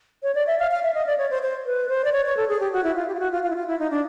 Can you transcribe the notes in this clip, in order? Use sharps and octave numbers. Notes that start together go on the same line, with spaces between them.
C#5
D5
E5
F5
F5
E5
D#5
D5
C#5
C5
C5
B4
C5
D5
C#5
C#5
A4
G#4
G4
F#4
E4
F4
G4
F4
F#4
F4
F4
E4
F4
E4
D#4
D4